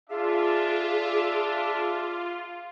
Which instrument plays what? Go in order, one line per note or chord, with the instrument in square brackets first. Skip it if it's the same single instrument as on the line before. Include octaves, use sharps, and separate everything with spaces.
[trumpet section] D4 E5 [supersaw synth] F4 [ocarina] G#4